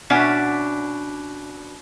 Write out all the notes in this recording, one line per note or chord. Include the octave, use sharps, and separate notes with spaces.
B2 C#4 D4 E5 F#5